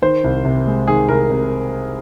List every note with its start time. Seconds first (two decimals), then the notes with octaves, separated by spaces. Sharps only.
0.02 D#3 C5
0.24 C2
0.45 C3
0.67 G#3
0.88 D#3 G#4
1.09 C2 A#4
1.30 C3